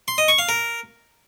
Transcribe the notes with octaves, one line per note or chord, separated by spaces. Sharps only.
C6
D#5
C#6
F5
A#4